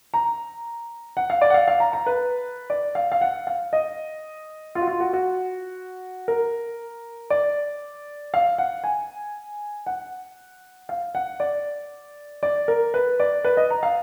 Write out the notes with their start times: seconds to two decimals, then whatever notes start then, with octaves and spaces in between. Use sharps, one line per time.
0.14 A#5
1.17 F#5
1.30 F5
1.41 D5
1.50 F#5
1.54 F5
1.68 F5
1.80 A#5
1.93 A#5
2.06 B4
2.70 D5
2.95 F5
3.12 F5
3.21 F#5
3.47 F5
3.73 D#5
4.75 F4
4.82 F#4
4.87 F4
5.00 F#4
5.13 F#4
6.28 A#4
7.30 D5
8.34 F5
8.58 F#5
8.84 G#5
9.86 F#5
10.89 F5
11.15 F#5
11.40 D5
12.43 D5
12.68 A#4
12.94 B4
13.20 D5
13.45 B4
13.57 D#5
13.70 A#5
13.83 F5